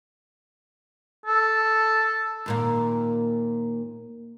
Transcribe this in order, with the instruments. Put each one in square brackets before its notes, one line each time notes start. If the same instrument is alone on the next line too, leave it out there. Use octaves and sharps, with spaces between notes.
[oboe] A4
[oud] D#2 A#2 A#3